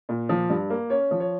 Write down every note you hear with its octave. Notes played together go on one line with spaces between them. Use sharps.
A#2
F3
G2
A#3
C#4 C#5
F3
C#5